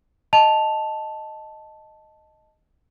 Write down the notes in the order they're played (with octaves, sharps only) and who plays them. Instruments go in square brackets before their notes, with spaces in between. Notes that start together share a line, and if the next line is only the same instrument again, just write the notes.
[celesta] D#5 A5 F7